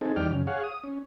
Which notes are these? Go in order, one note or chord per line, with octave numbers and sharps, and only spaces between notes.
C4 D#4 G#4 A4
E2 G3 D#4 D5 G5 F6
F#2 C#3
G#4 C#5 F5 F#5
D#6
C#4